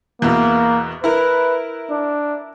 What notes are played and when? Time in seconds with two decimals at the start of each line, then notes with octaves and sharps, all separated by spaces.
0.22 E2 B2 A#3
1.04 E4 A#4 B4
1.91 D4